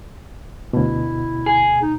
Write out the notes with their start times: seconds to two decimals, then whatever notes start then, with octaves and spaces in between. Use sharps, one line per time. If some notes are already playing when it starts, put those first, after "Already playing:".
0.73 D2 B2 E4
1.46 G#4
1.82 D#4